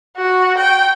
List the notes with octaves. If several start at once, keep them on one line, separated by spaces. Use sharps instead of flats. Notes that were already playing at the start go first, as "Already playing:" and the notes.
F#4
G5